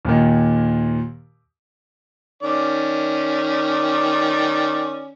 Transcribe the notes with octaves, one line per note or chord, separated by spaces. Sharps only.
D#2 A#2 D#3
D#3 C#4 D5